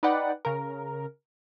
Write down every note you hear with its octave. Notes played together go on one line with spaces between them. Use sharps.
D#4 B4 D5 F#5 G5
C#3 A#4